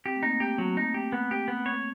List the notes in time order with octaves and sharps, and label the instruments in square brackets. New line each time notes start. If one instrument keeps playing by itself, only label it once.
[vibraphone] C4 [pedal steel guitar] G4
[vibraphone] A3
[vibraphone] A#3 [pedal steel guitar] D#4
[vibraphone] A3 [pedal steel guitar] G4
[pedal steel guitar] F#3 [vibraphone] A3
[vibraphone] A3 [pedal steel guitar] D#4
[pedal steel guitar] G4
B3
G4
B3
C#5